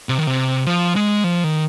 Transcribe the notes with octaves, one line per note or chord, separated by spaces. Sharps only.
C3
D#3
C3
F3
G#3
F3
D#3